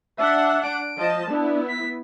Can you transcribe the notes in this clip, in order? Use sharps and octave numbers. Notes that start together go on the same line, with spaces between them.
D4 E5 F#5
D7
F3 D#5 A5
B3 D4 E4
B6